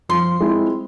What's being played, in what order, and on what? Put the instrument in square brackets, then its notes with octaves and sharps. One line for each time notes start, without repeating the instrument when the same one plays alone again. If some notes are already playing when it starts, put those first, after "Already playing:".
[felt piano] F3 [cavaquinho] C6
[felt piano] G#3 C4 E4